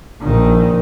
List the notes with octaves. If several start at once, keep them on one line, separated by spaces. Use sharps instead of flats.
A#1 D#3